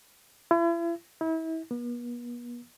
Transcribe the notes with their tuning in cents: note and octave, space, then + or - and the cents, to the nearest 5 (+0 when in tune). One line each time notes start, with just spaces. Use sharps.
E4 +40
E4 -35
B3 -40